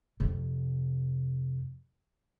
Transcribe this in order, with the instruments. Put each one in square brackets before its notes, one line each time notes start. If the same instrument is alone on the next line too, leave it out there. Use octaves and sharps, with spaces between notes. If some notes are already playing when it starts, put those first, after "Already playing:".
[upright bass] F2 C3